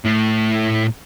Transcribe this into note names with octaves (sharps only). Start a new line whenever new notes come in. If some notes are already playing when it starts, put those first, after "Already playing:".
A2 A3